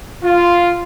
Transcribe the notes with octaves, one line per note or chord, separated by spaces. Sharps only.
F4